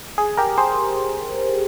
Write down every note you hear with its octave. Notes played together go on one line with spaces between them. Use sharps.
G#4
G4 A#4
G#4 C5